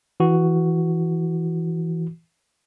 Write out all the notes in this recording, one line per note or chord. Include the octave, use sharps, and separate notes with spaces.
E3 F#4